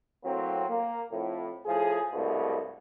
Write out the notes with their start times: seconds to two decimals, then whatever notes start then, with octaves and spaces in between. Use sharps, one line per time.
0.25 A2 F#3 A#3 C4
0.69 A#3
1.11 F2 A2
1.66 A2 F3 G#4
2.12 C2 G2 B2 G#3 A3